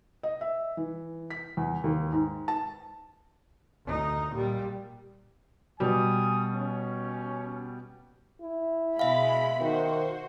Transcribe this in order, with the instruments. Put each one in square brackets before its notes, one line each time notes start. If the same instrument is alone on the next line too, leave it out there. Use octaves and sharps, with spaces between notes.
[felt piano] D#5
E5
E3
B6
E2
D#2
G#2
A5
[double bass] D2 D#4
A#2 G3
[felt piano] B2 G3 [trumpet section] G#5 D#6
[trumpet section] C#4
[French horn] E4
[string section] B2 G#3 B5 [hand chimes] E5 F5
[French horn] D#3 [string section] F#4 C5